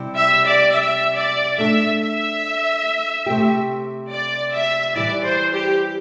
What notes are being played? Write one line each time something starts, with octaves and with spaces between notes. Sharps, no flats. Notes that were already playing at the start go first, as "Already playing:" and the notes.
Already playing: C3 G3 E4
E5
D5
E5
D5
A3 D4 A4 E5
E5
C3 A3 C4 G4
D5
E5
E3 G3 E4 D5
C5
G4